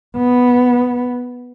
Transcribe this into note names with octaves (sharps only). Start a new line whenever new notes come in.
B3